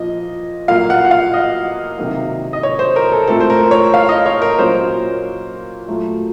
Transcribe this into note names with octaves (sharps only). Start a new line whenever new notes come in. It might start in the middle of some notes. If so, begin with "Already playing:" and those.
Already playing: A#2 F3 D#5
A#2 F#3 A#3 F5
F#5
F#5
F5
D#5
C3 D#3 F#3 A#3
D#5
C#5
C5
A#4
A4
A#2 A3 C4 A4
C5
A#4
C#5
F5
D#5
C#5
A#4
A#2 F#3 A#3 C#4 C5
A#2 F#3 A3